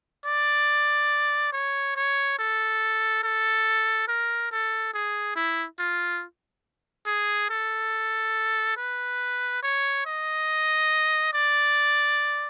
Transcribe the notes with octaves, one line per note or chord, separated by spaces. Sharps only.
D5
C#5
C#5
A4
A4
A#4
A4
G#4
E4
F4
G#4
A4
B4
C#5
D#5
D5